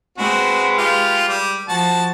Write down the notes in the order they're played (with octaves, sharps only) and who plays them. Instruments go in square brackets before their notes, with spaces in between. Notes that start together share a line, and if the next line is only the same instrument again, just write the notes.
[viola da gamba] G#3 B4 [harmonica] C4 F#4
[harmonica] F4 G4
G3
[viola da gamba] F3 [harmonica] F#4 A5